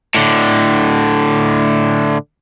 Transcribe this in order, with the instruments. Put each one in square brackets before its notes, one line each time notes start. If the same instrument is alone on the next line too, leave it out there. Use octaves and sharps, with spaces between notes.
[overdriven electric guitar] A2 D3